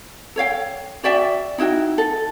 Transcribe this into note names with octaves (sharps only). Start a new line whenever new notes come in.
A4 C#5 F5 G5
F#4 D5 E5 G5
D#4 E4 F#4 G5
A4